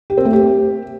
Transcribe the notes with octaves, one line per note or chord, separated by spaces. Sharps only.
G4
C4
A3
G4